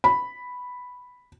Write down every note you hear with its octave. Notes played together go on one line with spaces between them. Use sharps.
B5